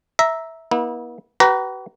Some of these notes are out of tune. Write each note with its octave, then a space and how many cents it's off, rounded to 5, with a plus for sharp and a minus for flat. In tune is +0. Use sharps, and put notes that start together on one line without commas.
E5 -10 A#5 +0
B3 -45 E4 -30
F#4 +45 B4 +5 A#5 +0